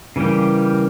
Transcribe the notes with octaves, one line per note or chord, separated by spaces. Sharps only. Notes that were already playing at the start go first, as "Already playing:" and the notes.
C#3 E3 G3 A#3 G4